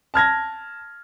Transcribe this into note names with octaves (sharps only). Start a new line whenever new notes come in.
A5 F6 G#6 A#6